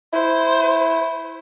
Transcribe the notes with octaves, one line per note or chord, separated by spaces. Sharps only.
E4 C5